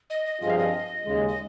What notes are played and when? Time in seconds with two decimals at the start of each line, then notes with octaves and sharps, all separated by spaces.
0.10 D#5
0.26 D#5
0.41 G2 F3 C4 F4 G#4 D#5
0.49 F5
0.58 D#5
1.05 D#2 C#3 G#3
1.28 D#5